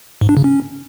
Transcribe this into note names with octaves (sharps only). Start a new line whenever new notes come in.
G#2
D4
C#3
C#4